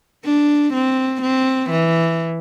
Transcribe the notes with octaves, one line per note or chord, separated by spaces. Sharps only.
D4
C4
C4
E3